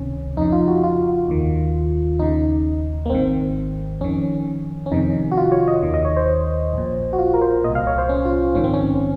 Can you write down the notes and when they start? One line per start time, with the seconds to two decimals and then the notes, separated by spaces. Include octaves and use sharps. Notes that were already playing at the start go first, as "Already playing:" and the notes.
Already playing: C#2 C3 D#3 C#4
0.37 F2 C#3 D#4
0.52 F4
0.68 F#4
0.83 F4
1.28 D#2 D#3
2.19 D#2 C#3 D#4
3.06 A#3
3.10 G#1 G#2 D#3 C4
4.01 F2 D#3 C#4
4.86 C#4
4.91 F2 C3 D#3 D#4
5.31 F#4
5.37 F4
5.52 C#5
5.68 D#5
5.83 D#2 D#3
5.94 D#5
6.05 C#5
6.16 C5
6.73 A#1 A#2
7.13 F#4
7.18 F4
7.34 A#4
7.41 C5
7.64 A#2 D#5
7.68 C2
7.75 F5
7.87 C#5
7.98 C5
8.09 C#4
8.25 F4
8.55 A#1 G#2 D#3 C#4
8.64 C4
8.73 C#4